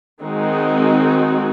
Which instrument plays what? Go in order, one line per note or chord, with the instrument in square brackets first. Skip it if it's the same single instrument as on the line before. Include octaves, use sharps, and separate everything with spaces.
[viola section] D#3 G#3 C4 D#4 F#4